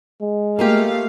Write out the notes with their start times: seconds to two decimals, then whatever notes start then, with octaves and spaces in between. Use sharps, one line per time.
0.21 G#3
0.59 A3 A#3 F4 G4 F5